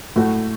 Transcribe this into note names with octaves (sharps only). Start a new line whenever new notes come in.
A2 F#3 A3 F#4